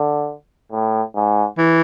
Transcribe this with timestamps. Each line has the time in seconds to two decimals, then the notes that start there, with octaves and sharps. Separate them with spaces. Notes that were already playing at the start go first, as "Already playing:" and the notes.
Already playing: D3
0.72 A2
1.16 G#2
1.58 E3